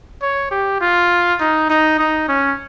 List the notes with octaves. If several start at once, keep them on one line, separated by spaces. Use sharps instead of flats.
C#5
G4
F4
D#4
D#4
D#4
C#4